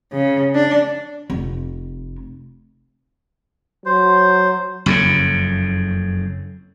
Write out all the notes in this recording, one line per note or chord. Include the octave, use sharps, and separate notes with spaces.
C#3
D4
F1
F#3 C5
F#1 F2 A#2 C#3